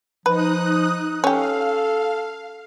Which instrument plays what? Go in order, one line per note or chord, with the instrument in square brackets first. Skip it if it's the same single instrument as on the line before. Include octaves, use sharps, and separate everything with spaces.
[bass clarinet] F3 [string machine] D#4 D#6 F#6 [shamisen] B4
[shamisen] C#4 G4 [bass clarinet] A4 [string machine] F5